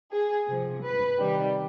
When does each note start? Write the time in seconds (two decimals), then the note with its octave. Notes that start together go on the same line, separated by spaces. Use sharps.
0.12 G#4
0.47 C3 F3
0.83 B4
1.18 C3 D#3 G3